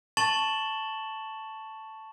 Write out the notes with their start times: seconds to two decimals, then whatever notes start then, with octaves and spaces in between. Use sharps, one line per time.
0.17 A5 C#6 A6 E7 F#7 G7